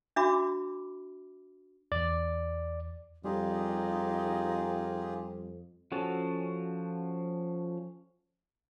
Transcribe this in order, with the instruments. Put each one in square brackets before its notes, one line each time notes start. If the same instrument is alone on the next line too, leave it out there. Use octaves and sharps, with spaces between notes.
[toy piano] D4 F#4 E5 B5 D6
[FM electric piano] E2 [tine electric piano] D5
[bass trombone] F2 [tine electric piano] G3 [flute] D#4 [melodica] F4 G4 G#4
[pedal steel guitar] F3 C#4 F#4 A4 A5